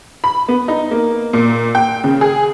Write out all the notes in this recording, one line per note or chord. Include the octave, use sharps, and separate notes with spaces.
B5
B3
D#4
A#3
A#2
G5
C#3
G#4